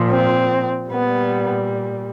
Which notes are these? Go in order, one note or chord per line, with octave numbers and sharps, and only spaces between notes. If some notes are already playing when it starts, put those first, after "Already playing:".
Already playing: A#2 F3
C4
A#2 G3 B3